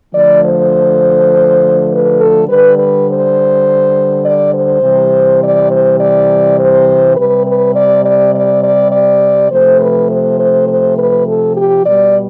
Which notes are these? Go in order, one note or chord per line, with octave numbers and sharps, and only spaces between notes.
D3 F3 A3 D5
C5
B4
A4
D3 G3 B4
B4
C5
D5
C5
C3 E3 G3
D5
C5
D5
C5
C3 G3 B4
B4
D5
D5
D5
D5
D5
C3 F3 A3 C5
B4
C5
C5
C5
B4
A4
G4
B2 G3 D5